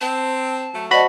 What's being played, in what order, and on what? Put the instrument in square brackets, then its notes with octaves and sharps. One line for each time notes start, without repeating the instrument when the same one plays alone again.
[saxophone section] C4 [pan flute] A5
[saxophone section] F#3 A3
[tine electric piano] F#4 B5 [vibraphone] C5 D#5 A5 [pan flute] D5